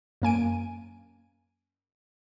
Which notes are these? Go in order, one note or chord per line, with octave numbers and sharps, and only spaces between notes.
F#2 A#3 G#5 D7